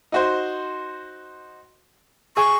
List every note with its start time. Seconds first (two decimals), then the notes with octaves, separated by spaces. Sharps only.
0.12 D#4 F#4 C5
2.37 G#4 G#5 C#6